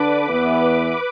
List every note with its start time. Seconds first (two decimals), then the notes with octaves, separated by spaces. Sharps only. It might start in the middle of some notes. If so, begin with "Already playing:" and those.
Already playing: D3 D4 B4 D6
0.28 E2 E3 B3